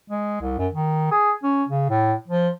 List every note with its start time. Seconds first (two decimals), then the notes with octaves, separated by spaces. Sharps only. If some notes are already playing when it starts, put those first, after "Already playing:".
0.10 G#3
0.41 C2
0.58 F#2
0.73 D#3
1.11 G#4
1.43 C#4
1.68 C#3
1.90 A2
2.28 F3